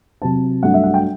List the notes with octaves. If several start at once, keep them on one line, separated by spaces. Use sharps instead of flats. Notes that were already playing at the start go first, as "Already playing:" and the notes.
C3 F#3 C4 A5
G2 F#3 A3 D4 F#5
E5
F#5
G5